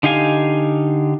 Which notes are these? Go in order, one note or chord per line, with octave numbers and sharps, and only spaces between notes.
D3 D#4 G4 F5 G#5